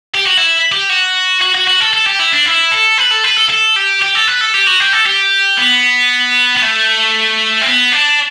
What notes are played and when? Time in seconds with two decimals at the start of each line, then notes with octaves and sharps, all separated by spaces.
0.15 G4
0.26 F#4
0.37 E4
0.72 G4
0.90 F#4
1.41 F#4
1.55 F#4
1.68 F#4
1.81 A4
1.93 A4
2.07 G4
2.19 E4
2.33 D4
2.46 E4
2.71 A4
2.98 B4
3.10 A4
3.23 B4
3.36 A4
3.49 A4
3.76 G4
4.02 G4
4.15 A4
4.27 B4
4.41 A4
4.54 G4
4.67 F#4
4.80 G4
4.93 A4
5.06 G4
5.57 B3
6.57 B3
6.62 A3
7.62 C4
7.66 B3
7.92 D4